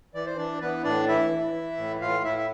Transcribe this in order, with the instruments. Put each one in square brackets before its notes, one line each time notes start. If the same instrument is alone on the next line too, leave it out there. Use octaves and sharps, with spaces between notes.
[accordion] E3 D5
C5
E3 D4 D5
E3 B3 B4
A2 D4 D5
E3 E4 E5
E3
E3
A2
A2 F4 F5
A2 E4 E5
E5